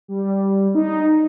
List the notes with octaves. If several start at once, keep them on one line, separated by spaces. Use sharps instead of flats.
G3
D#4